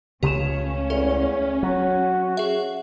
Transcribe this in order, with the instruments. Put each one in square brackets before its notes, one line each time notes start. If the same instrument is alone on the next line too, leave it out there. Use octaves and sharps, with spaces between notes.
[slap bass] C#2 C#3 A3 [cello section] C#4 [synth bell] G4 E7
[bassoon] E2 [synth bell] A4
[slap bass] F#3 [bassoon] F#4
[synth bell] G#4 E5